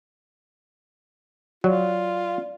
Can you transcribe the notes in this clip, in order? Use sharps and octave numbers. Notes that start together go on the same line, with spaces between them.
F#3 F4 D5